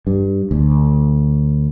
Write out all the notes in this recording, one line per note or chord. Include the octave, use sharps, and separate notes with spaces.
G2
D2